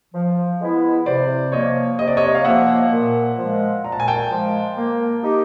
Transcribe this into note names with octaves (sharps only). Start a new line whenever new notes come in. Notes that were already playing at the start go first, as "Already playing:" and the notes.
F3
G#3 B3 E4
C3 C5 D5
F3 A#3 C#5 D#5
C3 D#5
D5
C#5 D#5
F5
F3 A#3 E5 F#5
A#2
F3 G#3
A#2 A#5
A5
G#5
G5 A5
F3 G#3
A#3
D#4 G4